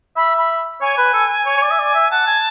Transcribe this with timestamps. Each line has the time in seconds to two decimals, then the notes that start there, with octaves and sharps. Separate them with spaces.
0.16 E5 B5
0.38 B5
0.81 C#5 G#5
0.97 B4
1.13 A4
1.46 C#5
1.57 C#5
1.62 D5
1.71 E5
1.79 D5
1.94 E5
2.11 F#5 A5
2.27 G#5